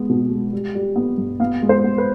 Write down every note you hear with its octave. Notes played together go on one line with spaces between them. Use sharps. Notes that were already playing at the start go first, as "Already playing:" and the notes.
Already playing: G#3 B3
B2
G#3
G3
G3
B3
G2
B3 F5
G#3
C5
B3
B4